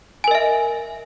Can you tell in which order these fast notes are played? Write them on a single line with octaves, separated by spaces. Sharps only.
G#5 A#4 D#5 E5